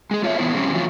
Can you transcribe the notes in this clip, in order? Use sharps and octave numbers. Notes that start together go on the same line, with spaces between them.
G#3 G#4
F4 C#5 E5
E3 B3 D4 E4 C5
F3 G3 C4 C#4
E3 F#3 A3 F4